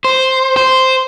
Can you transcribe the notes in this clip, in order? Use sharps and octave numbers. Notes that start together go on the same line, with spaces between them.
C5
C5